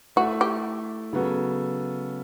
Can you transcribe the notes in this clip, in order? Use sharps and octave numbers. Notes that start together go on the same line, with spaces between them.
A3 E4 F#4 A4 E5
G4
C#3 F#3 B3 F#4 A4